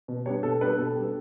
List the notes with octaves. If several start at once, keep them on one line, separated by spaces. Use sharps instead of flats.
B2
G3 B3 D4 C#5
B2 A4
G3 B3 D4 B4
B2 A4
G3 B3 D4